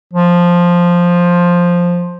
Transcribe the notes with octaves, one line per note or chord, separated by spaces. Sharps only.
F3